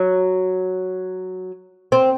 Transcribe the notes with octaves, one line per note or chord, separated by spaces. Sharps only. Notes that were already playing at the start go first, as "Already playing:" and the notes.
Already playing: F#3
C4